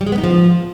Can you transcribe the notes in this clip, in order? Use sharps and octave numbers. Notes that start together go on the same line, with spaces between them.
G3
G#3
B3
D#4
F3